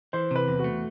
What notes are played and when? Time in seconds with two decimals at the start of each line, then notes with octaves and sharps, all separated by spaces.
0.13 E3 C5
0.31 C3 B4
0.48 E2
0.59 F#4
0.64 A3